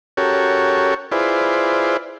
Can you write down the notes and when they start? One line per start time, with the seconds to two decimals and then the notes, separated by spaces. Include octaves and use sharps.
0.17 C#4 F#4 G4 A4 A#4 C#5
1.12 E4 F4 G#4 B4 C5 D5